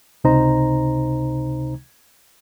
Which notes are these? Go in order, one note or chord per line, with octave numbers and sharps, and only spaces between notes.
C#2 C3 D#4 C5 A#5